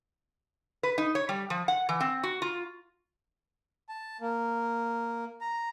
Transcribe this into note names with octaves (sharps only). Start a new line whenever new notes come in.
B4
D#4
C#5
G3
F3
F#5
E3
C4
F#4
F4
A5
A#3
A#5